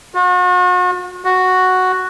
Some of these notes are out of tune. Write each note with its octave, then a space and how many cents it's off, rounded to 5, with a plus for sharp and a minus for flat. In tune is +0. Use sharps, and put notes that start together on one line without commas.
F#4 -40
F#4 +0